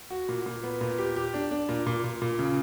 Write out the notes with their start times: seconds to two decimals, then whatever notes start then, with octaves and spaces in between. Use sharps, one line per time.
0.11 F#4
0.29 A#2
0.46 A#2
0.63 B3
0.81 A#2
0.99 G4
1.16 G4
1.34 D4
1.51 D4
1.69 A#2
1.86 A#2
2.04 A#2
2.22 A#2
2.39 C#3